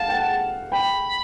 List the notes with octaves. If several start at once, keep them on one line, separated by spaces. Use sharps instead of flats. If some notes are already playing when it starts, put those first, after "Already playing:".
Already playing: F5 F#5 A5
G5
F#5
G5 B5